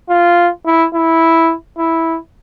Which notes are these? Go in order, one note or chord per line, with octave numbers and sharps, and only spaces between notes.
F4
E4
E4
E4